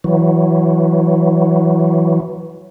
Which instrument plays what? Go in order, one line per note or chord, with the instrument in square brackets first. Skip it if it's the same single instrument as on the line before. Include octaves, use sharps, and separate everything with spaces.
[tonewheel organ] E3 F#3